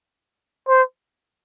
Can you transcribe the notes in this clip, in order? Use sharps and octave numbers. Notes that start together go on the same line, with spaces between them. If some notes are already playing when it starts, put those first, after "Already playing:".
C5